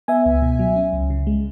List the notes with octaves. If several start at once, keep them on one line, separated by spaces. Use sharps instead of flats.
B3 E5 G#5
C#2
B2
F#3
C#4
C#2
C#3
G#3